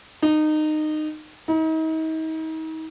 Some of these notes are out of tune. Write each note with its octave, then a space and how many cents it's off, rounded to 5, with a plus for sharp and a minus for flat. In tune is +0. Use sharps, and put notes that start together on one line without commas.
D#4 -20
D#4 +40